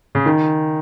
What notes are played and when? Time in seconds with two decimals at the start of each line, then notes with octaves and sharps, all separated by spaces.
0.15 C#3
0.26 D#3